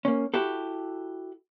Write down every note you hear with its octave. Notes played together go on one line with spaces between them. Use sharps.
A#3 C#4
E4 F#4 G4 A4